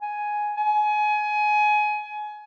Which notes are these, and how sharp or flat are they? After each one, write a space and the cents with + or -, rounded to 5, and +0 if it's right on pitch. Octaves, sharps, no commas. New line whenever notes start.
G#5 +5
G#5 +25